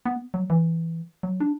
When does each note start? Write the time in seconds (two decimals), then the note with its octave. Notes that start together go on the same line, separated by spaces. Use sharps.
0.06 B3
0.34 F#3
0.50 E3
1.23 F#3
1.40 D4